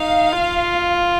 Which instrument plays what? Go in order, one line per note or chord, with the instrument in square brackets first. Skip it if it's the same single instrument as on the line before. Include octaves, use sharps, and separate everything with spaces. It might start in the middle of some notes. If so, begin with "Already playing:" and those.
Already playing: [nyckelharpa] D#4 [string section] F5
[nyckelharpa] F4